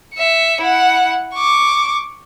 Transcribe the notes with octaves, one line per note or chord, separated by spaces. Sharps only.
E5 C#7
E4 F#5
C#6 D6